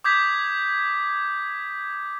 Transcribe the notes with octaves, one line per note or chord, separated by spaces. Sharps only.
D6 D#6 G6 G#6 B6